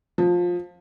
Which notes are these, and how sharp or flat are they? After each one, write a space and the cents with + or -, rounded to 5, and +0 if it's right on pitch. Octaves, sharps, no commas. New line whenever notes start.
F3 +20